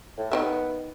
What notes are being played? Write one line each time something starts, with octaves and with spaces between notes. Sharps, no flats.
A2
D#3 E3 B3 E5